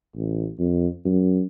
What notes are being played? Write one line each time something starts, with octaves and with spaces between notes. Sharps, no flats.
A1
F2
F#2